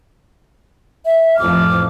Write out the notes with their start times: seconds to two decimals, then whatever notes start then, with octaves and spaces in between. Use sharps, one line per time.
1.04 E5
1.37 A1 F2 F3 D6 F6